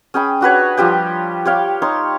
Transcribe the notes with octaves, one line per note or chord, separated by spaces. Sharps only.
C#4 G#4 G5 B5
D4 F#4 B4 C#5
F3 G3 G4 G5
G4 C#5 F5 G5
D#4 C#5 C6